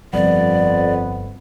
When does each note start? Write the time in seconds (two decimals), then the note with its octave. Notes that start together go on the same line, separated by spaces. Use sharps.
0.14 G1 F2 B3 D5